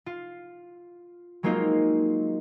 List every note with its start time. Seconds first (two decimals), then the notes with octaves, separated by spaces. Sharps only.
0.06 F4
1.43 F#3 G#3 A#3 C4 D#4 F4